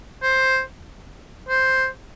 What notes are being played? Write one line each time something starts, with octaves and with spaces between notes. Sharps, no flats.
C5
C5